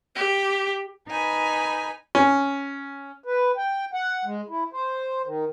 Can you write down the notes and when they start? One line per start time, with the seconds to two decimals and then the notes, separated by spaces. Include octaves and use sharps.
0.16 G4
1.08 D#4 B4 G#5 B5
2.15 C#4
3.24 B4
3.57 G5
3.94 F#5
4.25 G#3
4.49 E4
4.73 C5
5.25 D#3